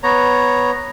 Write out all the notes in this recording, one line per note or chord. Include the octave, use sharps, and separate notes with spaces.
B3 C#5 A#5